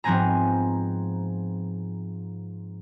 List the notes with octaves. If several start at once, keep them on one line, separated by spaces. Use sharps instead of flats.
G#2 F3 B3 C4 G#5 A#5